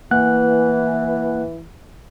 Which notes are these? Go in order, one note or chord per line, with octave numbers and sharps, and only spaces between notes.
E3 A#3 F#5 F#6